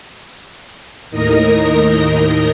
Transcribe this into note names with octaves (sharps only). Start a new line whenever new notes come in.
D#2 A2 D#3 A#4 D#5 A#6